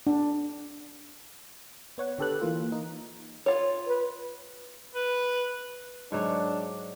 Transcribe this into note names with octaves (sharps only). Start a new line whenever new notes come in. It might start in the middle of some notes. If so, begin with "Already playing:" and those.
D4
B3 C#5 F#5
D3 G4 A4 B4 F#6
E3 A#3 F4
D#4
F4 C#5
B4
B4
G#2 F#3 D4 C#5